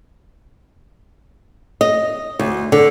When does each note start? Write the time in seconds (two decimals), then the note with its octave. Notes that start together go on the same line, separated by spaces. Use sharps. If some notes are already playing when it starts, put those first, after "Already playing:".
1.81 D#5
2.39 D2
2.72 D3